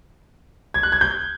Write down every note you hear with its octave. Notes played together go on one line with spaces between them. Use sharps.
G#6
F#6
G#6
G6